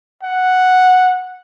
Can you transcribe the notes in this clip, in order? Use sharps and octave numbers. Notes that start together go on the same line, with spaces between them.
F#5